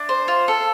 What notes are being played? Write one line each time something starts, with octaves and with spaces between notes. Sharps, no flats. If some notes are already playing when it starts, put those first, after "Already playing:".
Already playing: D4
C5
F4
A4